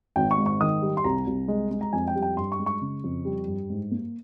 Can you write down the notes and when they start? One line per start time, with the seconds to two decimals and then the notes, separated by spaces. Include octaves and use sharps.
0.16 G#1 G5
0.31 C#6
0.38 G#2
0.46 C#6
0.61 D#3 D#6
0.82 G3
0.97 C6
1.04 C2 A#5
1.27 C2
1.48 G#3
1.71 G#3
1.81 A#5
1.93 F2 G#5
2.08 G5
2.15 G3
2.22 G5
2.37 G2 C6
2.52 C#6
2.59 G#3
2.66 C#6
2.81 C#3
3.04 F2
3.25 G3
3.48 G2
3.70 G#2
3.91 A#3